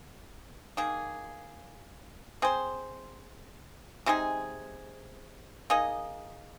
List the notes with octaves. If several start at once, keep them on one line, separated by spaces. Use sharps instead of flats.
D#3 A#3 G#4
C4 G#4 C5
C3 G#3 D#4 G#4
A#3 D#4 G#4 D#5